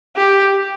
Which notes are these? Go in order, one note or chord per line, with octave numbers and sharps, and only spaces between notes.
G4